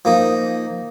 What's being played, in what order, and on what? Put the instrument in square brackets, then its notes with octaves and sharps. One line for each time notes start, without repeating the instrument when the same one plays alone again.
[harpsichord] F3 A#3 D#4